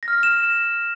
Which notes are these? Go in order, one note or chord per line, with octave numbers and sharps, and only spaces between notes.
A#6
F6
A#6
F6
E7